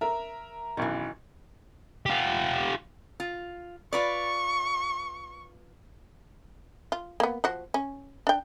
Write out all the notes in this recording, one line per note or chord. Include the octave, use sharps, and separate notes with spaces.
A#4 E5
B1 F#2 D#3 E3
F4 G4
F4
F4 B4 D5 C#6
F4
A#3 B3
F3 F#4
C#4
D4 G5